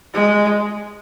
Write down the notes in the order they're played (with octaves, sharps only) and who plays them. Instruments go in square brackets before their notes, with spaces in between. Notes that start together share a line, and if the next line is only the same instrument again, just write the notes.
[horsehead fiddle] G#3